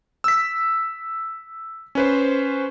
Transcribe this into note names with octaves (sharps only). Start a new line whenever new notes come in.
E6 B6
C#4 B4 C5